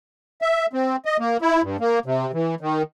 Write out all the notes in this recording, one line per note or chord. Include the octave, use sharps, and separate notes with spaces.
E5
C4
D#5
A#3
E4
G2
A#3
C3
E3
D#3